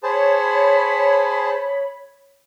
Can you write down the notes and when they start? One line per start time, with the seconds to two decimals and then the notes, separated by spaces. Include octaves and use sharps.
0.03 G#4 C5 C#5 A5 B5